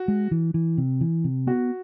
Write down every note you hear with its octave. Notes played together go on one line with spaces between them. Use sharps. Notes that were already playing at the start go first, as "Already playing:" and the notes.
Already playing: F#4
G#3
E3
E3
C3
E3
C3
B3 F#4